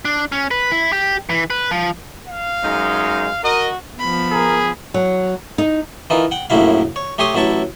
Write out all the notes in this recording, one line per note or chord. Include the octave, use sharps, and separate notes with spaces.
D4
C#4
B4
E4
G4
E3
B4
F3
F5
F#2 G#3 D#4
F#4 A#4 D#5
F3 B3 B5
G#4 A#4
F#3
D#4
E3 D#4 F4 A#4
F#5 G5
A#1 F#2 A2 F#3 E4 F5
C#5
A3 G4 C#5 C6 D#6
A1 F#3 E4 A4 C#6